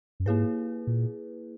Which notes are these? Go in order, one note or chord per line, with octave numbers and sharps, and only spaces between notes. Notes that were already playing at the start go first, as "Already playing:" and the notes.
F#2
G#2 A#3 E4 G#4 B4
A#2